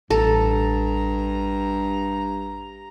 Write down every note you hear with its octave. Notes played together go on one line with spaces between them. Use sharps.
A1 G2 A4 A#5